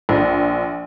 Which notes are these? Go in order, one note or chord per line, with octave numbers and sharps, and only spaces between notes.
A#1